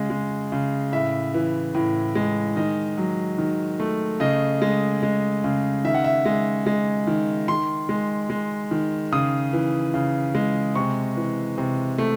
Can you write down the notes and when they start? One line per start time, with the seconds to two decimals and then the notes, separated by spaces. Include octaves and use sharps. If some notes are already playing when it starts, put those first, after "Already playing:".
Already playing: C#3 G#3
0.10 G#3
0.52 C#3
0.92 A2 E5
1.34 E3
1.74 A2
2.15 G#3
2.56 D#3 D#5
2.98 F#3
3.38 D#3
3.80 A3
4.20 C#3 D#5
4.62 G#3
5.03 G#3
5.44 C#3
5.84 D#3 E5
5.94 F#5
6.04 E5
6.25 G#3
6.66 G#3
7.07 D#3
7.48 D#3 C6
7.89 G#3
8.30 G#3
8.71 D#3
9.12 C#3 D#6
9.53 E3
9.94 C#3
10.35 G#3
10.75 C3 C#6
11.17 E3
11.58 C3
11.98 A3